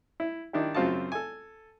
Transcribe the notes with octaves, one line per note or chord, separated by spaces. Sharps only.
E4
D#3 D4 E4 G4
F#2 C#3 C4 F4 F#4 A5
A4 G#5